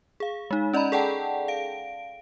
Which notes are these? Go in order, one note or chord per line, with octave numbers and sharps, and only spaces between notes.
G#4 F5
G#3 D#4
C#4 D5 D#5 A#5 B5
G#4 A4 D5 F#5 G5 A5
F5 D7